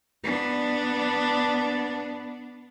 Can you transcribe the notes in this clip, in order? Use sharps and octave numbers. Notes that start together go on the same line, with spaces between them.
B3 D4